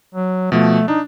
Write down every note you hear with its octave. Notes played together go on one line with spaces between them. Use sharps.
F#3
B2 F3 A3
D4 D#4